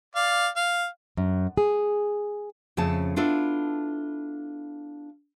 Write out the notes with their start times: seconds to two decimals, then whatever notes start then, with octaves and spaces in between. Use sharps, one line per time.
0.16 D5 F5
0.56 F5
1.17 F#2
1.57 G#4
2.77 F2 C#3 A3 C#4 A5
3.16 B3 D4 E4 F4 A4